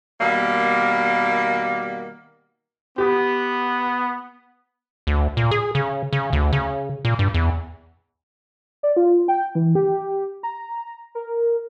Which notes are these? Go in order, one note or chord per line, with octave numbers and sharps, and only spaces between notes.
B2 D#3 G3 A#3
B3 G4
D2
A#2
G#4
C#3
C#3
D2
C#3
A#2
G2
E2
D5
F4
G5
E3
G4
A#5
A#4